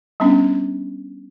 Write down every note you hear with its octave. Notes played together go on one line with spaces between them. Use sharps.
G3 B3 C#4 D4